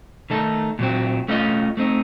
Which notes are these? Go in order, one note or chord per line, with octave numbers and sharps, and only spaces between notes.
D#3 A3 D#4 A4
A#2 F#3 C4
A3 C#4 F4 A#4 D#5
A3 C4 D#4